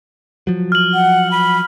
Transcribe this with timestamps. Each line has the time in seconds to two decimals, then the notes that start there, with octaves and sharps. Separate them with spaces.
0.47 F3 F#3
0.72 F6 F#7
0.94 F#5
1.31 B5